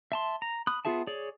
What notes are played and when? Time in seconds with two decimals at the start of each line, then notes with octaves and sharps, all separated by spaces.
0.12 E5 A5 C6
0.42 A#5
0.67 B5 D#6 F#6
0.85 B3 F4 G#4 E5 A5
1.07 G#4 C#5 D5